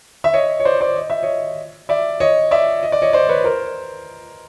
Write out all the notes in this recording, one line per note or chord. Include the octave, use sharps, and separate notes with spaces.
E5
C#5 D#5
C#5
C5 D5
C5 D5
D#5
E5
C#5 D#5
D5 E5
C#5 D#5
D5 E5
D#5
D5
C#5 D#5
C5 D5
B4 C#5
A#4 C5